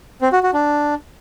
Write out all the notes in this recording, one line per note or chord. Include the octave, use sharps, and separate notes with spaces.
C4
F#4
F#4
D4